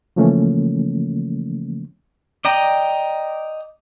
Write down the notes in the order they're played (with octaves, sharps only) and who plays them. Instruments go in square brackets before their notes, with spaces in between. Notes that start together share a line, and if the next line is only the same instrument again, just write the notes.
[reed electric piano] C#3 E3 F3 A3 A#3 C#4
[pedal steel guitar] D5 D#5 G5 A#5